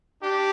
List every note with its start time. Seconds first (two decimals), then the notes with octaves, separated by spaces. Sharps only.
0.20 D4 G4